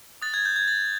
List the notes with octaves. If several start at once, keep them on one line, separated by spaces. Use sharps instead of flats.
D#6 F#6 A6
G#6
G6
G#6
A6